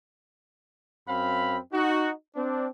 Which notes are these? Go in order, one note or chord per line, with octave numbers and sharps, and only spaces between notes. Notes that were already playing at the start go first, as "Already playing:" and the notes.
F#2 C4 F5 B5
D#4 F#4
C4 D4